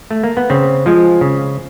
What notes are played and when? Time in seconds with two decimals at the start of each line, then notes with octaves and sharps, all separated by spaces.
0.11 A3
0.23 A#3
0.37 B3
0.50 C#3 C4
0.86 F3 G#3
1.21 C#3